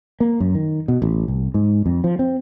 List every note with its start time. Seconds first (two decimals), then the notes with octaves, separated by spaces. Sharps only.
0.20 A#3
0.40 F#2
0.55 D#3
0.88 B2
1.02 A1
1.28 C2
1.54 G#2
1.86 F2
2.04 F3
2.19 C4